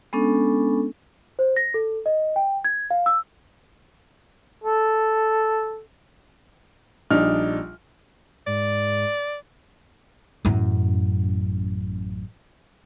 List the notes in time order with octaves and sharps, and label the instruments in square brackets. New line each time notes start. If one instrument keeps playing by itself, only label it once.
[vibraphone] G#3 B3 C#4 D4 A4
[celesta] C5
A#6
A4
D#5
G5
G#6
F5
E6
[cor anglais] A4
[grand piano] A#1 G3 D4 D#4 F6
[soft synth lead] G#2 [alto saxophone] D5
[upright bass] A1 F#2